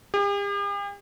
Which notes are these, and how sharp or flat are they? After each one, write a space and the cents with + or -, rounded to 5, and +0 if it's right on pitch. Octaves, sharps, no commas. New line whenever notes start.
G4 +45